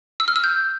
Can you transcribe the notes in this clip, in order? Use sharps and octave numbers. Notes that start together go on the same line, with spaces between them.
E6
F6
E6
G6